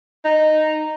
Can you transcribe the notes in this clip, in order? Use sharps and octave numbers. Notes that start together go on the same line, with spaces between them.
D#4